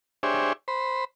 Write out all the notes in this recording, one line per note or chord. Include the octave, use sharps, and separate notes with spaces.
D4 G4 G#4 C5 C#5 E5
C5 B5